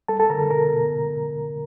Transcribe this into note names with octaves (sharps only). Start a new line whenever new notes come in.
G3 A4 A5
A4 A5
D3 A#4 A#5
B2 A#4 A#5
B2